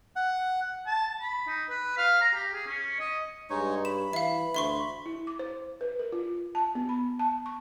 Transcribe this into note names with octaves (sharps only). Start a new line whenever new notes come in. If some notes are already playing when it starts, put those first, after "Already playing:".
F#5
A5
B5
D#4
B4
F5
A#5
G4
G#4
C#4
D#5
G2 G#3 D#4 C#5
B5 E7
E3 E5 F5
D2 E5 C6 C#6
E4
D6
C5
B4
A#4
F4
A5
B3
B5
A5
C#6